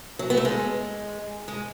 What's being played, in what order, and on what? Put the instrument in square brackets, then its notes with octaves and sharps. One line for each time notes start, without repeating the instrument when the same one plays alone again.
[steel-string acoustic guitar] F#3
B3
A3
G#3
G#3